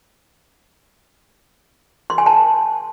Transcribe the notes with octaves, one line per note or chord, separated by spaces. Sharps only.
C6
G#5
A5